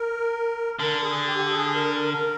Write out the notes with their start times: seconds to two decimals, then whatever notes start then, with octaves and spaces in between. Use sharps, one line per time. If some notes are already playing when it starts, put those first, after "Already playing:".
Already playing: A#4
0.80 D3 A#4
1.03 G#4
1.27 G4
1.51 G#4
1.74 A#4